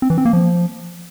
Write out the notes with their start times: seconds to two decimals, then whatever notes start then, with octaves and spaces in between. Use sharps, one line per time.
0.02 C4
0.10 E3
0.18 C4
0.25 A#3
0.33 F3